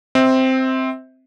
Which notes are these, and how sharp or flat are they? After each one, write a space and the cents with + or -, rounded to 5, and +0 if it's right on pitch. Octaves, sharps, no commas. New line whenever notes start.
C4 +0 E5 -30